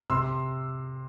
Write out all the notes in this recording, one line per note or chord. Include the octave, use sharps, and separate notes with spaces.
C3 C6 E6